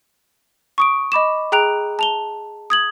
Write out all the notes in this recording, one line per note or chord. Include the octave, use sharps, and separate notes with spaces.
C#6 D#6 D7
D#5 B5 D6 E7
G#4 G5 A#5 F#6 D7 F7
A5 F7 G7
D#6 G#6 F#7